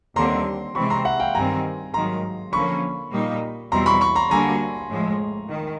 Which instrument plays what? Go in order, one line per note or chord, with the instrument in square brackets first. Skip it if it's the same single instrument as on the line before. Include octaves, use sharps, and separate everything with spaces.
[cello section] D#2 D3 G3 C4 [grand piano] A#5 C6
[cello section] C3 E3 G#3 C4 [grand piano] B5 C#6
[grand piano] A#5 C6
E5 F#5
F5 G5
[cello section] G2 D#3 G3 C4 [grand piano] G#5 A#5
[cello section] G#2 D#3 F#3 [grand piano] A#5 C6
[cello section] D3 F3 A#3 C#4 [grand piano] B5 C#6
[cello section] A#2 G3 A#3 D#4
[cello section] E2 B2 G3 C4 E4 [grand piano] A#5 C6
[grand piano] B5 C#6
B5 C#6
A#5 C6
[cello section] D3 G3 A#3 D4 F#4 [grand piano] G#5 A#5
[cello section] A2 F3 G#3
D#3